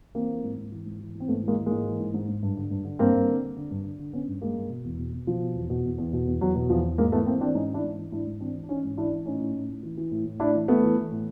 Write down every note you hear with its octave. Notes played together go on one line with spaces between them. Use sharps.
E3 A#3 C4
E3
G#2
G#2
E3
G#2
E3
E3
C4
G#2 A3 B3
E3 G#3 A#3
E3
G#2 G#3 A#3
E3
G#2
G#2
G#2
G2
D3
G2
D3
G2 A#3 C4
G2
D3
D3
D3
G2
D3
D3
D3 B3 C#4
G2
G2 G#3 A#3
G2
B2
E2
B2
B2
B2 F3
B2
E2
B2
E2
E2
B2
E2
E2 F#3
B2
E2 F3
E2
G#2 G#3 A#3
E3 A3 B3
E3 A#3 C4
E3 C4 D4
G#2 C#4 D#4
E3
D4 E4
G#2
E3
G#2 D4 E4
G#2
E3 C4 D4
E3
D4
E3 C#4 D#4
G#2
E3 D4 E4
E3
A2 C#4 D#4
A2
A2
A2
E3
E3
A2
A2
A2 D4 E4
E3
E3 A3 B3
E3
E3
A2